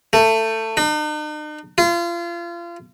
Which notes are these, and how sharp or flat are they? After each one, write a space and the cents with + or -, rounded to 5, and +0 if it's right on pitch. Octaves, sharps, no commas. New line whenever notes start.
A3 +20
D#4 -45
F4 -30